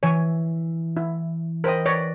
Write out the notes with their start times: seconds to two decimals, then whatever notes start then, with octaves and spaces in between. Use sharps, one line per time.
0.03 E3 C#5 G#5
0.97 E4
1.64 A#4 C5 D#5 G5 B5
1.86 B4 C#5 D5 A#6